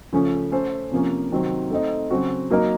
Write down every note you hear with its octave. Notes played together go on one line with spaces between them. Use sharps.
C#3 F3 A3 C#4
A3 C#4 A4 C5
C3 F3 A#3 C#4
C3 D#3 F#3 C4
A3 C4 D#4
C#3 F#3 C4 F#4
F#3 A#3 D#4 A#4